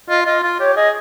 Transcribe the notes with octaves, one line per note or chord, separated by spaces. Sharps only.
F4 D#5
F4 D#5
F4
G4 C#5
G#4 D#5